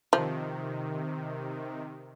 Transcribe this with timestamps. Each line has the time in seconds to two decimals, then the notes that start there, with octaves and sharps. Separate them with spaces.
0.13 C3 D#3 F3